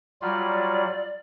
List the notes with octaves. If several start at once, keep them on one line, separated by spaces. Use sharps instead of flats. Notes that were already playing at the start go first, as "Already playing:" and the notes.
F#3 G3 F4 D5